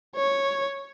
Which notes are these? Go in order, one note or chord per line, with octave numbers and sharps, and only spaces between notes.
C#5